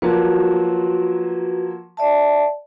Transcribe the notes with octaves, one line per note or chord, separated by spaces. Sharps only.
F3 F#3 A#3 F#4 B4
D5 E5 A5